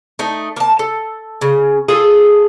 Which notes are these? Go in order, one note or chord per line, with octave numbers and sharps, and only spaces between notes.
A3 D#4
A#3 A5
A4
C#3
F4 G#4 A4